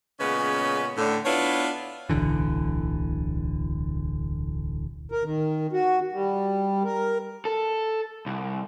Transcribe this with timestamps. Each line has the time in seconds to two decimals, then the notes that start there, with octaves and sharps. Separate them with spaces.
0.20 A#2 C#3 G#3 B3 C#4 B4
0.97 A2 D3
1.26 B3 D4 E4 F4 B4 C#5
2.09 D1 B1 D3 E3
5.12 A#4
5.24 D#3
5.73 F#4
6.12 G3
6.84 A#4
7.45 A4
8.26 C2